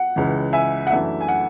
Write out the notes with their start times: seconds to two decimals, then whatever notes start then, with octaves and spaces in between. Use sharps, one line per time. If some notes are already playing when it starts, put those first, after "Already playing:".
Already playing: F#5
0.16 C#2 C#3 E3
0.53 E5 G#5
0.87 F#5
0.90 F#2 E3 A3 D4 E5
1.21 G#5
1.28 F#5